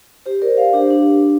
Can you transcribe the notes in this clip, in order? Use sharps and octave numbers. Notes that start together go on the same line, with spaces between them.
G4 C5
A#4 D5
C5 F5
D4 G4
D4